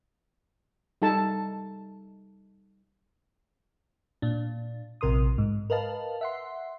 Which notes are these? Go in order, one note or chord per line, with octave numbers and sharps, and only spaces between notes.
G3 D#4 A4 A5
A#2 D4
A#1 C3 A#4 C6 D#6
G#2
A#4 B4 D#5 F5 A5
E5 F#5 C6